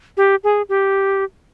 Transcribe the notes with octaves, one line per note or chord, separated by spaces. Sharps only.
G4
G#4
G4